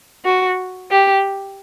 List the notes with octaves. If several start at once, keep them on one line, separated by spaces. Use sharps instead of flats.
F#4
G4